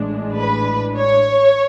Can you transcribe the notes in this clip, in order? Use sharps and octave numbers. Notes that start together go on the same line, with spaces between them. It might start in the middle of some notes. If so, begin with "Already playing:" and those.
Already playing: A1 A2 G#3 D4
B4
C#5